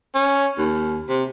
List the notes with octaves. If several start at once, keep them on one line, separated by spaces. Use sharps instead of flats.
C#4
D#2
C3